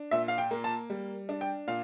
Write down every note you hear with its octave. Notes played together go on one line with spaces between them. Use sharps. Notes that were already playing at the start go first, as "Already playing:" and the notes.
Already playing: D4
A#2 E5
F5
G5
A#3
A5
G3
D4
G5
A#2 F5